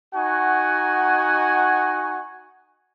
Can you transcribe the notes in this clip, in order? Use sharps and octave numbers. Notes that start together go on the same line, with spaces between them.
D#4 F#4 F#5 G#5 C#6